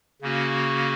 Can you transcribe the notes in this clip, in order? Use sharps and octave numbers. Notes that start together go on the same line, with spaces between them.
C#3 A#3 C#4 F#4